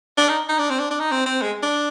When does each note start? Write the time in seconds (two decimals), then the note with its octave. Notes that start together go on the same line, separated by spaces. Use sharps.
0.17 D4
0.29 D#4
0.49 D#4
0.59 D4
0.70 C4
0.79 D4
0.90 D4
1.00 D#4
1.11 C4
1.26 C4
1.42 G#3
1.62 D4